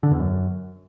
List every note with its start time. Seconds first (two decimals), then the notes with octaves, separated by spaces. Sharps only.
0.03 D3
0.11 E2
0.20 F#2